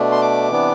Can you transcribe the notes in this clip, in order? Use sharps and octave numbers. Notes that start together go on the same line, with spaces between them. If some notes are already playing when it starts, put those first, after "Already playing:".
Already playing: B2 A3 D4
C6
D6
C3 E3 B3 D4